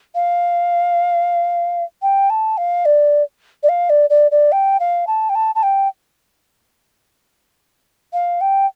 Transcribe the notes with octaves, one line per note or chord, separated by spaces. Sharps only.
F5
G5
A5
F5
D5
D5
F5
D5
D5
D5
G5
F5
A5
G5
A5
A5
G5
F5
G5